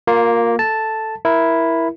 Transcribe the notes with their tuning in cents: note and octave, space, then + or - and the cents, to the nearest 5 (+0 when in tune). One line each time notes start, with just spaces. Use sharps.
A#3 +0 F4 +25
A4 +0 A5 +0
E4 +0 A#4 +15